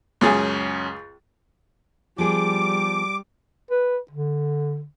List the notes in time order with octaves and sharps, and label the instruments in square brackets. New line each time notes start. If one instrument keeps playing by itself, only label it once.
[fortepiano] C#2 G#4 G#5 [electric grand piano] F#2 C#4 A6
[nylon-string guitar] F3 B3 G#4 [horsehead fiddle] G3 [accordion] D6
[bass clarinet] B4
D3